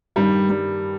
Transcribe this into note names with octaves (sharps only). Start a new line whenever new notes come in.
G2 D#3 G3
G3